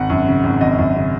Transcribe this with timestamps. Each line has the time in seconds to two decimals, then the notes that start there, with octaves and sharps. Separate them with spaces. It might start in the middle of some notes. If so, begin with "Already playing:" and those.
Already playing: G#1 F#5
0.10 F#2
0.27 C#3
0.44 G#1
0.61 G#1 D#5
0.78 F#2
0.95 C#3